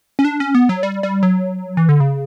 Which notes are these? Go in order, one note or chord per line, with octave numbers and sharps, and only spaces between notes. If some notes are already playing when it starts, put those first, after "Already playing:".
C#4
D4
C#4
B3
F#3
G3
G3
F#3
E3
D3
C#3